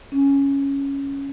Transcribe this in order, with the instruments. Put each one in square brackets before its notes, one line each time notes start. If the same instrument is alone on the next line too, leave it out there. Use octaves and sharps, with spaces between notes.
[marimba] C#4